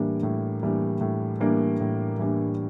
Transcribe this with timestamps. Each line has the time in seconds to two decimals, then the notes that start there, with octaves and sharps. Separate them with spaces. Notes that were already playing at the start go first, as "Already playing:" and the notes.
Already playing: A2 E3 G3 A#3 D4
0.23 A2
0.63 E3 G3 A#3 D4
1.01 A2
1.40 E3 G3 A#3 D4
1.80 A2
2.19 E3 G3 A#3 D4